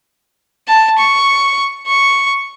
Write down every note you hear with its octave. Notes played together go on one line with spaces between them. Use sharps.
A5
C#6
C#6